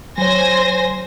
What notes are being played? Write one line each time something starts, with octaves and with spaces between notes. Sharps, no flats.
F#3 C5 C#5 G#5 A#6